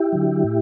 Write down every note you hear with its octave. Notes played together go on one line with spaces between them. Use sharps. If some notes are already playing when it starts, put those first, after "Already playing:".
Already playing: E4 G4
D3 F#3
A2